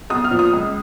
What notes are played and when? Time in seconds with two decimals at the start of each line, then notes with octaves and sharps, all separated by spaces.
0.10 B1 D#6
0.24 F6
0.31 A#2 F3
0.39 D#6
0.53 C#2